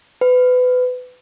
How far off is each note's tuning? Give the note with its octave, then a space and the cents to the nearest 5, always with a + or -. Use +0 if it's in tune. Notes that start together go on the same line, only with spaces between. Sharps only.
B4 +25